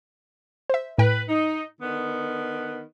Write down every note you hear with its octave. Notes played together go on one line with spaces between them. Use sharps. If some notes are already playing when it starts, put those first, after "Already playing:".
C5 E5
A2 B4 G5
D#4
D3 D#3 B3